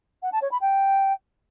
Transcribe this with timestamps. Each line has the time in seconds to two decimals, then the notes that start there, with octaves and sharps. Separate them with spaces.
0.22 F#5
0.32 A5
0.41 C#5
0.51 B5
0.61 G5